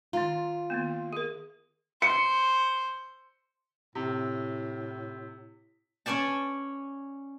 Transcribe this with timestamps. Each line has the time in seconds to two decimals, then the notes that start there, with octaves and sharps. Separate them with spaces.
0.13 D#3 F4 A#5
0.70 D#3 A#3 B3
1.13 G#4 A#4
2.02 C5 C#7
3.95 A2 C3
6.06 C#4 C#5 D5 G#5 A5